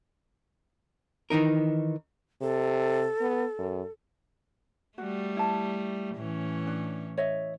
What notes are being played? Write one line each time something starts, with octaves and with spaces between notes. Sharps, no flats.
D#3 E3 D#4 A#4
C3 A4
B3
F#2
G3 A3 F#4
E4 A5
A2 E3 C#4
D4
C#5 D#5 E5